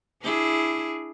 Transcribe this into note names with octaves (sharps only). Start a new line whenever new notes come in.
D4 E4 G#4